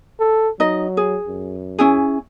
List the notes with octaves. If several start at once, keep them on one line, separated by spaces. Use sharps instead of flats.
A4
F#3 D#4 D#5
G#4
F#2
C#4 E4 G#4